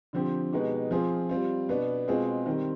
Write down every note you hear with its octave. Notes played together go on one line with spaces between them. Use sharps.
D3 F3 C4 G4
B2 G#3 B3 D#4 G4
F3 C4 F4 G#4
G3 C4 F4
B2 B3 D4
B2 G#3 C4 F4 G#4
D#3 G3 C4